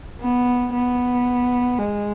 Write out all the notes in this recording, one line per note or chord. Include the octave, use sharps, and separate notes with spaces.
B3
B3
G#3